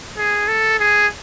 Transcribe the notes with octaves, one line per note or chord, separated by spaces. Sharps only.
G#4
A4
G#4